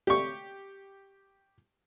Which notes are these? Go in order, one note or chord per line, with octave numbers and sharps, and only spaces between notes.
G4 C#6